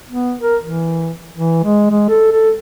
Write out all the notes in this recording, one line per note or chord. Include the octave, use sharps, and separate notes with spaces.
B3
A#4
E3
E3
G#3
G#3
A4
A4